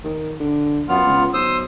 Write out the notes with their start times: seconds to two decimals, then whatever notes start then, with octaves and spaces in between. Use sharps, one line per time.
0.04 D#3
0.40 D3
0.89 F#2 B3 F4 F6
1.06 C#2
1.33 B1 C5 D#6 E6